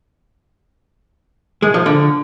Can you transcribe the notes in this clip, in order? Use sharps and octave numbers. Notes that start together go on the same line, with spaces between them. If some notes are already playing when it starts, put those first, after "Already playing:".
G#3
F3
D3